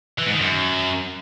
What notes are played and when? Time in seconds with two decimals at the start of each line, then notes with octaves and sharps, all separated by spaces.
0.19 E3
0.26 G#2
0.33 D#3
0.40 F#2